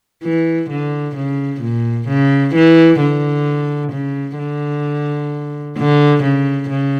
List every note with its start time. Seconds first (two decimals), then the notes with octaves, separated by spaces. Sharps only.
0.23 E3
0.70 D3
1.16 C#3
1.62 A#2
2.08 C#3
2.55 E3
3.00 D3
3.92 C#3
4.38 D3
5.78 D3
6.24 C#3
6.70 C#3